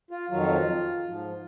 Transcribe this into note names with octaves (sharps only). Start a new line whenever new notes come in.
F4
F2 D#3 F#3 F4
G#2 F3